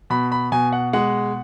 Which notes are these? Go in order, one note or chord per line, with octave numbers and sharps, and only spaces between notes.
B2 B5
B5
B2 G#5
F#5
G#3 F#5